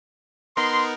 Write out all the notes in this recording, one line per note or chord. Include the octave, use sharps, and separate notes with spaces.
B3 D#4 A#4 C6